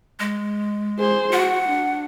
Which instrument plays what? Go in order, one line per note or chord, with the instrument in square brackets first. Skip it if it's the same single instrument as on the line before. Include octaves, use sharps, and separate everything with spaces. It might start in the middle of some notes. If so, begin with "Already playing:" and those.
[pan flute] G#3
[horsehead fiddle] G#4 C5
[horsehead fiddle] F#4 [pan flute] F#5
[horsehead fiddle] D4